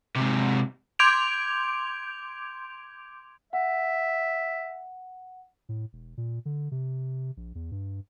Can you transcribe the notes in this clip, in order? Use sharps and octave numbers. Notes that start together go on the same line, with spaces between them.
G#2 C3
C6 D6 G6 G#6 D7 F7
E5 F#5
A2
E1
A#2
D3
C3
A#1
E2
G2